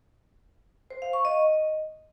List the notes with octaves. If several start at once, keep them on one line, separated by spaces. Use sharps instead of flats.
C5
F5
C#6
D#5